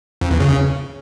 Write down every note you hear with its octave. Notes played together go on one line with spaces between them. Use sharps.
F2
E2
C#3